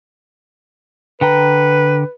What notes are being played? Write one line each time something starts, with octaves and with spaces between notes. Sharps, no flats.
D3 B4 G5 A#5